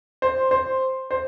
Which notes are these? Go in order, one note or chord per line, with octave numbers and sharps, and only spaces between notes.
C5
C5
C5